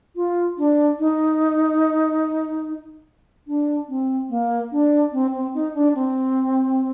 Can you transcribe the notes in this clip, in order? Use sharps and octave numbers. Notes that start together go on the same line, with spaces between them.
F4
D4
D#4
D4
C4
A#3
D4
C4
C4
D#4
D4
C4